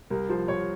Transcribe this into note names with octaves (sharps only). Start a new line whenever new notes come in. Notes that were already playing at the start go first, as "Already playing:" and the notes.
C2 A#4
F3 C5
C2 C#5